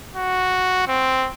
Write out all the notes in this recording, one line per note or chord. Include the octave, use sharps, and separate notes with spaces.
F#4
C4